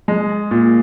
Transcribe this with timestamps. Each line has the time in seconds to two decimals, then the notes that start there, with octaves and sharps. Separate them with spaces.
0.08 G#3
0.51 A#2